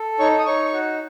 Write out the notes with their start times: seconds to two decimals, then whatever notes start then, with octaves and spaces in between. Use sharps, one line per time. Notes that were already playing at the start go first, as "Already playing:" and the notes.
Already playing: A4
0.19 D#4 C#5 C#6
0.39 D#6
0.46 D#4 C#5 C#6
0.73 F#4